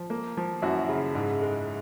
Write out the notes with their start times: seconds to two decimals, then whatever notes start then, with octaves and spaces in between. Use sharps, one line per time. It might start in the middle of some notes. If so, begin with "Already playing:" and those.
Already playing: F3
0.10 A#3
0.37 F3
0.62 F#2 E4 F#4
0.89 C#3
1.15 G#2
1.41 G#3